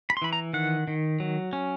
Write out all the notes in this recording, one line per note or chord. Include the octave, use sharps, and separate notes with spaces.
B5
C6
E3 B5
A#5
D#3 F#5
D#3
F#3
C#4